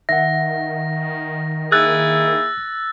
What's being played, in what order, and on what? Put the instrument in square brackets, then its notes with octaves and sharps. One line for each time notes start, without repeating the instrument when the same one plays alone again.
[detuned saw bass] D#3 [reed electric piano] E5 F#5 [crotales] A#6
[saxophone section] A#3 E4 G#4 [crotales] E6 F#6 A6